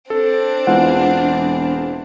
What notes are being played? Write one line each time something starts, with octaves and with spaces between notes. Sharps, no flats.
C4 D4 A4
E1 E3 G#3 F4 F#5